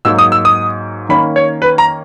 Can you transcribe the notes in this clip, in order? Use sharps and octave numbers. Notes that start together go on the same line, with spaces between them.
G#2 F#3 A#3 E6
D#6
E6
D#6
D#3 A#3 C#4 B5
C#5
B4
A#5